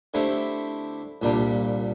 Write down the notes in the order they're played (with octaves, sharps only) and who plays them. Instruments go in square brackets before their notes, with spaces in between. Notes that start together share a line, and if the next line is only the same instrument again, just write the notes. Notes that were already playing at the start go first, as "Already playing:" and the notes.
[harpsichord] D3 A3 C4 E4 G4
C2 A#2 G3 D4 G4